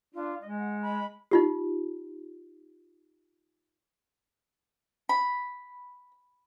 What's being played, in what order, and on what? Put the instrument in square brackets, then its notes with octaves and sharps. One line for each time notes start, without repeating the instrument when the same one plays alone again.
[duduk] D4 [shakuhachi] F4
[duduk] G#3 [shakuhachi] D#5
[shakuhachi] F#5
B5
[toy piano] D#4 F4 G4
[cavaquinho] B5